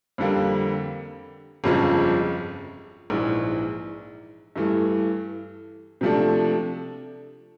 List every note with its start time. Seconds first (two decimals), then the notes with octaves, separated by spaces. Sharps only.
0.18 F2 D3 G3 A#3
1.64 G1 F2 C#3 F3 G#3
3.10 A#1 G#2 E3
4.56 G2 E3 A3
6.01 C3 F3 A3 D4